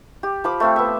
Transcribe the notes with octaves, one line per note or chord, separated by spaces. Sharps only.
G4
F3 B5 D6
A3 C4 F5
B3 E5